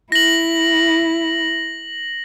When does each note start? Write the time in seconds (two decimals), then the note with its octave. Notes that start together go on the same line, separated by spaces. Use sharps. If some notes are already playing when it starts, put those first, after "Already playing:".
0.12 E4 A#6 F#7